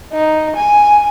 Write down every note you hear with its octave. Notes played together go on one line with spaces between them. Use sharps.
D#4
G#5